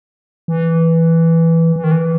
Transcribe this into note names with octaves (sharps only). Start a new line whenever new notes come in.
E3
E3
D#3
E3